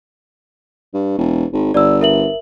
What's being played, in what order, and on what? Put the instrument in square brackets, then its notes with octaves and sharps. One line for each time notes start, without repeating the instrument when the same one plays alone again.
[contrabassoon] G2
E1
G#1
[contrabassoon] G1 [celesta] D5 E6
[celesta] A#4 E5 F#7